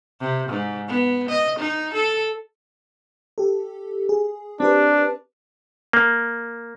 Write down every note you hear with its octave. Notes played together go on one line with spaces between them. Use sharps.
C3
G#2
B3
D#5
D#4
A4
G4 A4
G#4
C4 D4 G4 B4
A#3